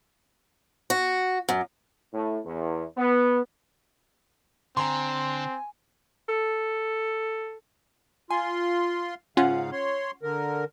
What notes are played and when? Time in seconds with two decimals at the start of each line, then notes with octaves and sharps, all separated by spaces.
0.90 F#4
1.49 F#2
2.13 A2
2.45 E2
2.98 B3
4.77 D3 C4 G#5 A#5 C6
6.29 A4
8.31 F4 G#5 C6
9.37 G#2 C#3 C#4 F4 F5 F#5
9.72 C#5 C6
10.23 D3 A#4